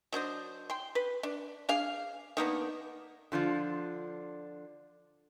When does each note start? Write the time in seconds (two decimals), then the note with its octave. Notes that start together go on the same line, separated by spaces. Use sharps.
0.12 F#3 D4 C5 D#5
0.70 G5 C6
0.95 B4
1.23 D4
1.69 D4 G#4 F5
2.37 D#3 A#3 B3 D4
3.32 D3 F3 D4 F4